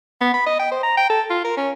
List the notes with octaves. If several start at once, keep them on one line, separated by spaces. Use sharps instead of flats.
B3
B5
D#5
G5
C5
A#5
G5
A4
F4
A#4
C#4